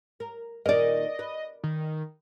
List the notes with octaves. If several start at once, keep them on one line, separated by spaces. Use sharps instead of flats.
A#4
A#2 D#3 A#4 D5 D#5
B4
D#3